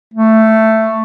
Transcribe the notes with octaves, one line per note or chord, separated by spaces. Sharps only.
A3